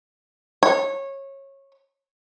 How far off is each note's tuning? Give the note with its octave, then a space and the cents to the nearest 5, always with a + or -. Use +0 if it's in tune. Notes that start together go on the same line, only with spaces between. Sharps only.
C#5 -20